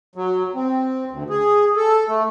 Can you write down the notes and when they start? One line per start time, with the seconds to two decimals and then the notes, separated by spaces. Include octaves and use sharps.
0.16 F#3
0.55 C4
1.11 D2
1.30 G#4
1.76 A4
2.08 A3